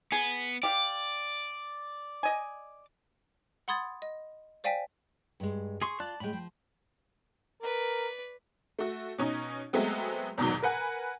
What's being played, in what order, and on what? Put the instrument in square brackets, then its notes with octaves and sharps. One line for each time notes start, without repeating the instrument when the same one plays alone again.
[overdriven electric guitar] B3 [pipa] G#4
[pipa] G4 F5 [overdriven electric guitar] D5
[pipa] D#5 G#5
[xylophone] F#5 B5 C6 D#6 G#6 A6
D#5
C5 D5 F5 G5 G#5 B6
[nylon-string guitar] G2 G#3
[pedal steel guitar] G#4 C6 C#6
[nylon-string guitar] F4 [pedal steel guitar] D5 A5 F#6
[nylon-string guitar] A2 G#3 [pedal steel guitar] G5 B5
[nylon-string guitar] F3
[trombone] A#4 [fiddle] B4 D5
[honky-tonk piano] A3 F#4
B2 C#4 D#4
F#3 G#3 A3 B3 C4
E2 G#2 B2 D#3 F#3
A#4 B4 F#5 G#5